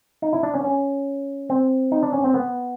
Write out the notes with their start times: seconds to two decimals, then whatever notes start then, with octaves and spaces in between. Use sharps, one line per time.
0.22 D#4
0.33 E4
0.43 D4
0.54 C#4
0.64 C#4
1.50 C4
1.92 D#4
2.03 D4
2.13 C#4
2.24 C4
2.34 B3